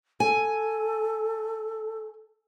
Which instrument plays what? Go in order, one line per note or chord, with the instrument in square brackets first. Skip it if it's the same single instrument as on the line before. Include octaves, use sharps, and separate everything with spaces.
[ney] A4 [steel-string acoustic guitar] G#5